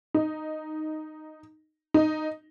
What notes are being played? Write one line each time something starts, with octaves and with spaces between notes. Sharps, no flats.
D#4
D#4